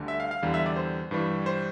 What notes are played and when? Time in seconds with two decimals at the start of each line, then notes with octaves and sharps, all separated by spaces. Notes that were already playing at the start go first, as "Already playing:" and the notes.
Already playing: D2 D3 G3
0.08 E5
0.20 F5
0.31 F5
0.42 E2 D3 G3 F5
0.54 E5
0.66 D5
0.76 C5
1.11 G2 E3 G3
1.46 C5